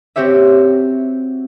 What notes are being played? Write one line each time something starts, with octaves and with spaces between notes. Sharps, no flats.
C4 F#4 G4 C#5 E5